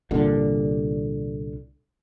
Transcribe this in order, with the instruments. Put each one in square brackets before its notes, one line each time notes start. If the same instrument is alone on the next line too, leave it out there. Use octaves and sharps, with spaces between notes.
[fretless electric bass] C2 A#2 D3